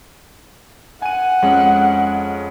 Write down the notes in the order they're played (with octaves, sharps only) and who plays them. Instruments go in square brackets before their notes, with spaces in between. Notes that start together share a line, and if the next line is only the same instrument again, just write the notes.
[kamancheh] F#5 [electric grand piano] G#5 D#7
[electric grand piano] F2 G#3 C#4